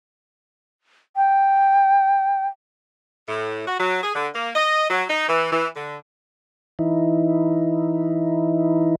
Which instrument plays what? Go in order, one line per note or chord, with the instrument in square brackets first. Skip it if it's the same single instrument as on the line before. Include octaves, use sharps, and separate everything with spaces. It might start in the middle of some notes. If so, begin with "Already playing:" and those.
[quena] G5
[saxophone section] A2
F#4
F#3
G#4
D3
A#3
D#5
F#3
D#4
E3
E3
D3
[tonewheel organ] E3 D#4 E4